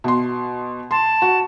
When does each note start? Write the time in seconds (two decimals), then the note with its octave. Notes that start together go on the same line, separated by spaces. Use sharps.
0.04 B2 C6
0.91 A5 C6
1.22 F#4